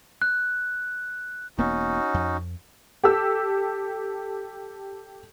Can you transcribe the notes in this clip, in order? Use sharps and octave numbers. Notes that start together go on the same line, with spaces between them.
F#6
E1 A#3 B3 C#4 D#4 F#4
F2
G4 A4 E6